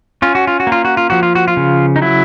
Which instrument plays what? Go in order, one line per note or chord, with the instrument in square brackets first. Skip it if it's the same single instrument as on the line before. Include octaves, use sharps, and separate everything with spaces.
[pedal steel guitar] C#4 F4
F#4
F4
F#4
A#3
F4
F#4
F4
F3 F#4
F4
F#4
F4
C#3
D#4
F#3 E4